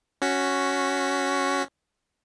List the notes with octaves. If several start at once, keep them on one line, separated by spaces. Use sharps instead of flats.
C#4 F#4 B6